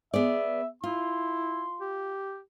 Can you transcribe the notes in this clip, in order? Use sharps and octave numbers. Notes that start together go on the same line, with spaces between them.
B3 G#4 D5 E5
E4 F4 C6
G4